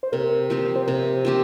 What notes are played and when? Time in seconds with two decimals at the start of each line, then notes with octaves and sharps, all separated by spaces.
0.03 C5
0.12 C3 A#4
0.50 F3 C4 G4
0.76 C5
0.87 C3 A#4
1.25 F3 C4 G4